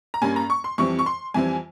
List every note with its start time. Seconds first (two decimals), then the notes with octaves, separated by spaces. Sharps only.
0.14 A#5
0.22 G2 G3 A#3 C#4 G#5
0.36 A#5
0.50 C#6
0.64 C6
0.78 F2 E3 G3 C4 C#6
0.99 C#6
1.06 C6
1.34 F2 E3 G3 C4 G#5